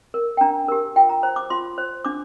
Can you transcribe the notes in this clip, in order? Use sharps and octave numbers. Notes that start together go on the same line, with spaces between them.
A#4
G5
D4 A#5
G4 A#4
F4 G5
A#5
C5 A#5
D6
F4 C6
C5
D4 D6